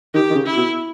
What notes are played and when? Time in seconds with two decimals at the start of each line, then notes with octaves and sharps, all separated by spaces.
0.14 D#3 G4
0.31 D#3
0.35 C#3
0.46 E4
0.57 B2